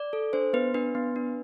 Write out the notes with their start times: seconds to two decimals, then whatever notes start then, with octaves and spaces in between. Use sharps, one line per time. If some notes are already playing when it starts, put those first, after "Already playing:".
Already playing: D5
0.13 A4
0.33 D4 C5
0.53 B3 B4
0.74 D4 B4
0.95 B3
1.16 D4